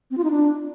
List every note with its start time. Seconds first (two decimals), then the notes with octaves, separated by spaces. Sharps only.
0.11 C4
0.17 F4
0.24 D#4
0.31 D4